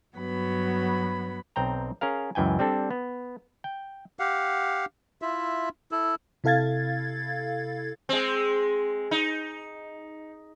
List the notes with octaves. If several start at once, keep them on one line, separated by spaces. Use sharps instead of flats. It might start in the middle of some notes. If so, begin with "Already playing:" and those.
G2 F#3 B3 F#4 B5
B1 C4 G5 A#5
C#4 G#4 A#4 F5
C#2 F#2 E3 G5 G#5
G3 C4 D4 A4
B3
G5
G4 F5 F#5
E4 F4 E5
E4 A4
C3 E4 A4 F5 G#6 A6
G#3 C4
D#4